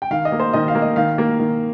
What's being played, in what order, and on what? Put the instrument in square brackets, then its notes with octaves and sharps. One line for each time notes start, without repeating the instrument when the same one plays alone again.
[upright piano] G5
D#3 F5
D#5
A#3
C5
D#3 D#5
F5
A#3
D#5
D#3 F5
A#3
D#3